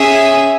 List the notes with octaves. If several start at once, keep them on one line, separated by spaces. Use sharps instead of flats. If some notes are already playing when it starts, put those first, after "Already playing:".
Already playing: C#4 G#4 E5